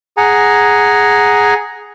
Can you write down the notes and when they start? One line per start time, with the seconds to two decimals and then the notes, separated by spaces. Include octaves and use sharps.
0.17 G#4 F#5 G#5 A#5